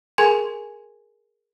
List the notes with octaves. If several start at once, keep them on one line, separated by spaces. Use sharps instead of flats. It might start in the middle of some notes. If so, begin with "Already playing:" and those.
G#4 A#4 G#5 C6 G#6 F7